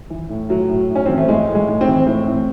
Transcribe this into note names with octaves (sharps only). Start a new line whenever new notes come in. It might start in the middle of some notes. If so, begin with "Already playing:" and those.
E3
A2
A2 F#3
A2
A2
C#4
E3 C4
A3
A2 G#3
A2
G#3
A2
C4
E3
A2 C4
A2